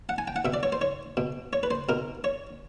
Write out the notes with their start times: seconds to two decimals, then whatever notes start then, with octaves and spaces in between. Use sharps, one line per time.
0.09 F#5
0.18 G#5
0.28 G5
0.36 F#5
0.45 B2 E5
0.54 D5
0.63 C#5
0.72 C5
0.81 C#5
1.17 B2
1.53 C#5
1.63 B4
1.71 C5
1.89 B2 A#4
2.24 C#5